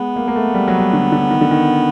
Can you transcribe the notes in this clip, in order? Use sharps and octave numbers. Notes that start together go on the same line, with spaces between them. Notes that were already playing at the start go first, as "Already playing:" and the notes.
Already playing: G#3 B3
A#3
A#3
A3
G3
F#3
G3
D3
D3
D#3
D3
D#3